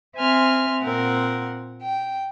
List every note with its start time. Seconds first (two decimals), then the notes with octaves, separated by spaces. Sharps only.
0.16 C4 E5 G#5 C6 F6
0.83 A#2 C4 A#4 F#5
1.81 G5